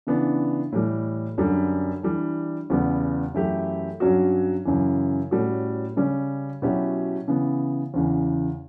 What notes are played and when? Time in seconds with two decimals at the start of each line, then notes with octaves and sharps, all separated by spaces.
0.07 C#3 E3 B3 D4
0.72 A2 E3 G3
1.38 F#2 D3 G3 D4
2.03 E3 G3 D4
2.70 E2 C#3 G3 B3
3.34 F#2 E3 A3 E4 G4
4.00 G2 F#3 C#4 F#4
4.65 F#2 C#3 E3
5.31 A2 G3 C#4 F#4
5.96 C#3 G3 C#4
6.62 B2 F#3 C#4 E4 G4
7.28 C#3 E3 B3
7.94 E2 C#3 E3